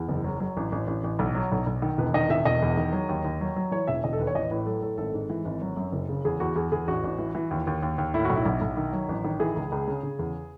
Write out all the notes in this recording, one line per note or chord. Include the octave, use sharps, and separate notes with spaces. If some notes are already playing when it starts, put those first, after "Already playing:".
Already playing: E2
F#1
F#3
F#3
A1
A1
A1
A1
B1
F#3
B1
B1
D#3
E1 B4
D#3 D#5
E1 E5
E1 D#5
E2
D#3
F#3
D#2
D#2
F#3
F#3
E3 C#5
E1 E5
E1 D#5
A4
D#2 B4
C#5
A1 D#5
A2 B4
F#3 A4
A2 A4
G#1 A4
G#2
E3
G#1
F#3
F#2
F#1
C#3
E2 G#4
E2 F#4
E2 G#4
E2 G#4
A1 F#4
A1
E3
E3
D#2
D#2
D#2
D#2
A2 E4
B1 F#4
E4
B1
B1
D#3
F#3
A1
D#3
E3 G#4
C#2
C#2
C#3
C#3
E2